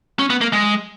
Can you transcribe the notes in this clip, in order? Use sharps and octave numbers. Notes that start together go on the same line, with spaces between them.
C#4
B3
A#3
G#3